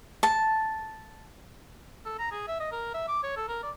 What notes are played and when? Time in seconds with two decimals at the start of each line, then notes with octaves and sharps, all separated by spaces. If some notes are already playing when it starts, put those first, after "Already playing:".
0.23 A5
2.05 A4
2.19 A#5
2.32 G#4
2.48 E5
2.60 D#5
2.72 A#4
2.94 E5
3.08 D6
3.23 C#5
3.37 A4
3.48 A#4
3.63 D5